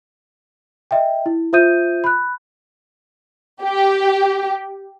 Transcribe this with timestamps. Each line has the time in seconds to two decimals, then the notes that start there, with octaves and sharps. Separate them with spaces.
0.91 D#5 E5 G5
1.26 E4
1.53 F4 C5 E5 D#6 G6 D#7
2.04 B5 F#6
3.63 G4